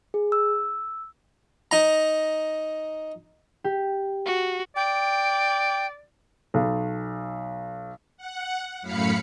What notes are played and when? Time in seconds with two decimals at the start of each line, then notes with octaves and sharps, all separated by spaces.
0.14 G#4
0.32 E6
1.71 D#4 A#5
3.64 G4
4.26 F#4
4.76 D5 G5
6.54 B1
8.17 F#5
8.82 F#2 A2 F5 B5 C#7